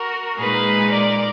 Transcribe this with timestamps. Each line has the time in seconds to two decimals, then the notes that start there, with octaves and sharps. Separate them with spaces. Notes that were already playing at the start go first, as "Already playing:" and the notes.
Already playing: F#4 A#4
0.38 A#2 G#3 D#4 G#4 B4
0.91 A#4 D5